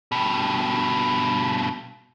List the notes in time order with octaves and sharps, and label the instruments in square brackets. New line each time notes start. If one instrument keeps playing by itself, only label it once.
[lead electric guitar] G2 B2